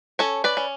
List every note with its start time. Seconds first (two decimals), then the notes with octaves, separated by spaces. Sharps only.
0.19 C#4 A4 C#5
0.44 B4 D5
0.57 C#4